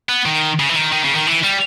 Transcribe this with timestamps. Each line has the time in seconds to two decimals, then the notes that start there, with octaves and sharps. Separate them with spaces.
0.09 B3
0.26 D#3
0.60 C#3
0.69 E3
0.76 D#3
0.92 D#3
1.04 C#3
1.15 D#3
1.27 E3
1.43 G3